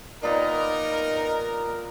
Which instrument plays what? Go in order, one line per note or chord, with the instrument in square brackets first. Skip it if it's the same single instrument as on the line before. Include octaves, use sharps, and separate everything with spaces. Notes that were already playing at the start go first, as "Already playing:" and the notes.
[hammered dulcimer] A#2 B3 G4 [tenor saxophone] D#4 [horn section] A#4